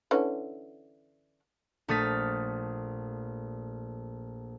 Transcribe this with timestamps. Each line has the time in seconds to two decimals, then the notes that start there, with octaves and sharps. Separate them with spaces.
0.11 D3 E3 C#4
1.88 A#1 A3 D#6 F6 A6 B6